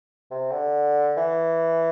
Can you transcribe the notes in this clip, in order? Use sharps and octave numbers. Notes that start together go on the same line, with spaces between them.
C3
D3
E3